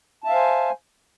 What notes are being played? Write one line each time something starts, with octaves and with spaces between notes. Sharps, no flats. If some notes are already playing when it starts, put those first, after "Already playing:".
C5 E5 F5 G#5 A5